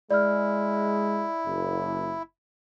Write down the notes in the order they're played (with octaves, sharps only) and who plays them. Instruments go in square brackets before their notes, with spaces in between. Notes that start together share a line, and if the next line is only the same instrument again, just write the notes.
[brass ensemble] G#3 [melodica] E4 [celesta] D5 F6
[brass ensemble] F#1